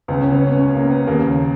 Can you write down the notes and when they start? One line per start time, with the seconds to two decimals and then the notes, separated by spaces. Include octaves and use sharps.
0.08 C#2 C#3 B3
0.21 C#4
0.33 B3
0.45 C#4
0.58 C#4
0.75 A#3
0.91 B3
1.07 D#2 C#3 A#3